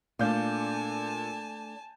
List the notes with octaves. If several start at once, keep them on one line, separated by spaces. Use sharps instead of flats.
A#2 A3 D4 F5 G#5 A5 G6